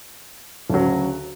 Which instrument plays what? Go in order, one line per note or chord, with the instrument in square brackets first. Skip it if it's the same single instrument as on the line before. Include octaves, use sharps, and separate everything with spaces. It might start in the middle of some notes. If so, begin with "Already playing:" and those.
[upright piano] D2 C#3 F#3